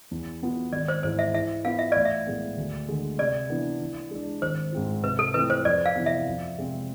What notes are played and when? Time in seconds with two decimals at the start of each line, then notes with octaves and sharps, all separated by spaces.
0.11 E2
0.42 B2 B3 F4
0.72 G#1 D5
0.88 C5
1.03 G#2 E3 G#3 C5
1.19 E5
1.34 E3 E5
1.65 B3 F4 F5
1.79 E5
1.92 A1 D5
2.05 E5
2.27 A2 G#3 B3
2.57 D2
2.88 D3 G#3
3.18 C3 D5
3.50 E3 B3 D4
3.80 E3
4.11 G#3 D4
4.42 G#1 C5
4.72 G#2 G#3 C4 F4
5.03 C3 B4
5.19 A4
5.34 E3 A3 C4 F4 B4
5.50 C5
5.65 F2 D5
5.86 F5
5.96 C3 E3 B3
6.06 E5
6.27 F2
6.57 C3 G#3 C4 G#4